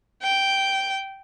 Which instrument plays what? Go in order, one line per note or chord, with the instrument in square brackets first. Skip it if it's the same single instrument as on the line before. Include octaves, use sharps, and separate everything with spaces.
[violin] G5